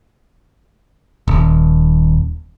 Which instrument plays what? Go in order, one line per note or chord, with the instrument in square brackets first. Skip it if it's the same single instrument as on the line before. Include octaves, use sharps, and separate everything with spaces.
[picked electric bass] D#1